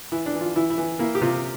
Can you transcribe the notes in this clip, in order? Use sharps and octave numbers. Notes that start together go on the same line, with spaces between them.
E3 E4
D4
E3
F4
E3 E4
E4
E3
A#3 E4
G4
C3 F4